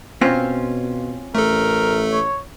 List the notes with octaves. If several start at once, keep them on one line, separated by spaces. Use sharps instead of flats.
B2 C4 C#4 F4
A1 A3 A4 A#4
C#5